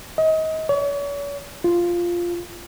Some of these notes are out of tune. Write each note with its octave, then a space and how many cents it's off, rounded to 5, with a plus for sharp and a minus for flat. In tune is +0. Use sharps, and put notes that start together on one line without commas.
D#5 +30
C#5 +40
F4 -5